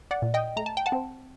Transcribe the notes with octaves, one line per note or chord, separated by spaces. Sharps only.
D5 F#5
A#2
D#5 G5
A3 A#5
A5
G5
F#5 A5
C4